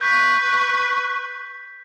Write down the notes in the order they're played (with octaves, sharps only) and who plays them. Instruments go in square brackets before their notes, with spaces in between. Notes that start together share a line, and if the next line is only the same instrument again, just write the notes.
[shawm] B4 [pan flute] C#6 [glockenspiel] G6 B6